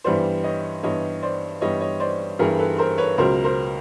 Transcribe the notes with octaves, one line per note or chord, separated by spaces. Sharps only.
G2 E3 G3 B3 C5 D5
C#5 D#5
G2 E3 G3 B3 C#5 D#5
C5 D5
G2 E3 G3 B3 C#5 D#5
C#5 D#5
C5 D5
G2 E3 G3 B3 G#4 A#4
A4 B4
A#4 C5
B4 C#5
C#2 B2 F#3 A#4 C5
A#4 C5